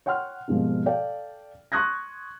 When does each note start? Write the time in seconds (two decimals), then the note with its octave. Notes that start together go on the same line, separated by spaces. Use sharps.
0.06 C#5 F#5 G5 C6 F6
0.48 C2 G#2 B2 F3
0.86 A4 D5 F5 G5
1.72 C6 C#6 D#6 F#6 G#6 A#6